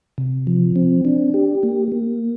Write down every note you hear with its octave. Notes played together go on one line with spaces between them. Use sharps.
C3
F3
C4
D4
G4
A#3
A#3